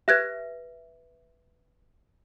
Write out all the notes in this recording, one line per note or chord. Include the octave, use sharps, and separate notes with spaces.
G4 B4 E5 F#6 G#6